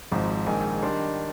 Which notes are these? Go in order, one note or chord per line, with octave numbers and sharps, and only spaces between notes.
G#1 G#2 F3
A#1 G#2 D#3 G#5
D#3 G3 D4 C6